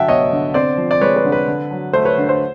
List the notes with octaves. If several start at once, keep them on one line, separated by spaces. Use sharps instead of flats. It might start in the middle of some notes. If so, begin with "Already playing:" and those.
Already playing: D3 F#3 E5 F#5 G5 A5
B3 C#5 D#5
D3
C4 C5 D5
F3
D5
G#3 B4 C#5
B4
D3
B4
D3
F#3
A3 C5
B4 C#5
D3
C5